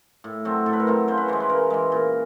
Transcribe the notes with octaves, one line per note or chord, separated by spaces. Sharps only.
A2
F#3 A3 C4
A2 A4
B4
A#4
F#3 A3 C4
C#3 C5
B4
E3 G#3 C5
B4
C#3 A#4
E3 G#3
A#2